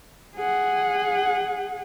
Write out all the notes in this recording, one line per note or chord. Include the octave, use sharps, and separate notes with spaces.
G#4 F#5